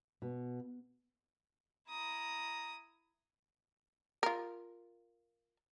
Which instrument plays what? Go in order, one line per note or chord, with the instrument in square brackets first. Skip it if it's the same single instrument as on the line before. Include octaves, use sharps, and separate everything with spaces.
[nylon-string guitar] B2
[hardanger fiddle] E4 D#6 [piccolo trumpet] A#5
[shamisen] F4 A#4